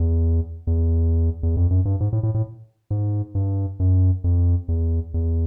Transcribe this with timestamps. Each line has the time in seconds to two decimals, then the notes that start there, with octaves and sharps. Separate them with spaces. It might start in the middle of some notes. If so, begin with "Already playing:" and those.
Already playing: E2
0.67 E2
1.43 E2
1.57 F2
1.70 F#2
1.85 G2
2.00 G#2
2.13 A2
2.23 A2
2.34 A2
2.90 G#2
3.35 G2
3.80 F#2
4.24 F2
4.68 E2
5.14 E2